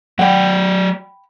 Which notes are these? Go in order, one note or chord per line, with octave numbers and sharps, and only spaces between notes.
F#3 D5 F#5 G5 B5